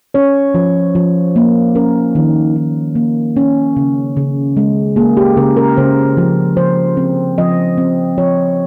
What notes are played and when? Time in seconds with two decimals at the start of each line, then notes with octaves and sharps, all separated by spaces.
0.14 C#4 C#5
0.55 F3
0.95 F3
1.36 A#3
1.75 C#4 A#4
2.15 D#3
2.56 D#3
2.95 A#3
3.37 C#4
3.77 C#3
4.17 C#3
4.57 G#3
4.96 A#3 G#4
5.17 G4
5.37 C#3 A#4
5.57 A#4
5.77 C#3 C5
6.17 F3
6.57 F3 C5
6.97 C4
7.38 F3 D#5
7.78 C4
8.18 F3 C#5